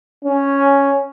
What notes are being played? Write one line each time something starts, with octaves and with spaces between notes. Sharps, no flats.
C#4